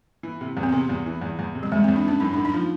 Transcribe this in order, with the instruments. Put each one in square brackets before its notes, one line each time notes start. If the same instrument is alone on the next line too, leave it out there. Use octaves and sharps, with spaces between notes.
[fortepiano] E3
C3
E2
[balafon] C4
[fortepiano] C3 [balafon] B3
[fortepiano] E2
E3
E2
E2
C3
[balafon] G3
[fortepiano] E2 [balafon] G#3
[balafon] C4
[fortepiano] E2
[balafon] D4
[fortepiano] E3 [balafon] C#4
[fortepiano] F#2 [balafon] D#4
[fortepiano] F#2 [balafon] D4
[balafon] D#4
[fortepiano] F3